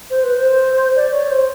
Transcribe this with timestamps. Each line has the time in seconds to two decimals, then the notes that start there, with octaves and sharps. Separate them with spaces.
0.10 C5
0.23 B4
0.36 C5
0.96 D5
1.13 C#5
1.30 C5